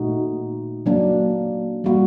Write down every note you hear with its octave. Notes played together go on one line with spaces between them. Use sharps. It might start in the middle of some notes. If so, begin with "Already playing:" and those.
Already playing: A#2 A3 D#4 F#4
F#3 A#3 D4
G3 A#3 F#4